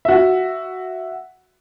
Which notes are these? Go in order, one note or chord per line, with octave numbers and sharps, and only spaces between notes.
F#4 E5